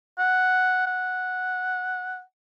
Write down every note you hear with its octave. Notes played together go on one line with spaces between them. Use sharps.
F#5
F#5